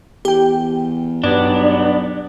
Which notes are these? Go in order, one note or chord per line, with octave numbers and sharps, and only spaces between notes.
E2 G4 G5
B1 G2 F#3 G3 B3 D4